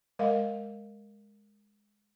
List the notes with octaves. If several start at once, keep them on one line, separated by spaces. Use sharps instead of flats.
G#3 A#4 D#5 F5